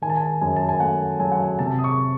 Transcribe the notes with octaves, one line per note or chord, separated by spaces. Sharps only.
D#3 G#5
A5
G#5
F#2 G#5
A5
G#5
A3 F#5
F#3 G#5
F#5
G#5
C3 A5
D#6
C#6